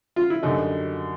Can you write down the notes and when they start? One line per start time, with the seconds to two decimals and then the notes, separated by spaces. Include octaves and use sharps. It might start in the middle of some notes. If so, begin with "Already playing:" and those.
0.16 F4
0.30 E4
0.43 F#2 D3 G3 D#4